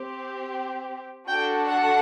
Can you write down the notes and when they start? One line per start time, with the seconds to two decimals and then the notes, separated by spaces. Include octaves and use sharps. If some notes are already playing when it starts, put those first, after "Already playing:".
Already playing: C4 G4
1.28 D4 F#4 A4 G5
1.66 F#5